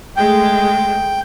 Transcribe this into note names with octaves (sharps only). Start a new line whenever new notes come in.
G#3 A3 G5